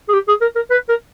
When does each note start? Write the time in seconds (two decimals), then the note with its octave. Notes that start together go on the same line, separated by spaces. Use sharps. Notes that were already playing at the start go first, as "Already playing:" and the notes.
0.08 G#4
0.13 G4
0.28 G#4
0.41 A#4
0.55 A#4
0.70 B4
0.89 A#4